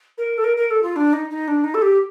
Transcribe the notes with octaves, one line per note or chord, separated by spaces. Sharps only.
A#4
A4
A#4
A#4
A4
F4
D4
D#4
D#4
D4
D#4
A4
G4